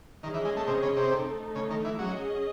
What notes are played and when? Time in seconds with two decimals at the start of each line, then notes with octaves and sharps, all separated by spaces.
0.23 D#3 C#4 G#4 D#5
0.34 E3
0.45 G#3
0.57 A3
0.67 C3
0.83 C#3
0.96 C3
1.12 A3 D#4 A4
1.55 C#3
1.70 D#3
1.85 E3
1.99 F#3 C#4 G#4 D#5